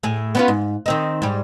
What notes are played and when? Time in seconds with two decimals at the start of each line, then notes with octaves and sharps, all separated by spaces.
0.03 A2 G#4
0.35 B3 C#4 F4
0.48 G#2
0.86 D#3 C4 D#4
1.22 G#2 G3